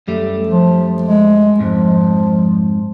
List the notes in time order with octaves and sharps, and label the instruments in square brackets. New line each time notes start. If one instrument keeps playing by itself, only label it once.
[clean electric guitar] F#2 G3 A3
[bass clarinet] F3
G#3
[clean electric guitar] F2 G#2 [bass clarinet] F3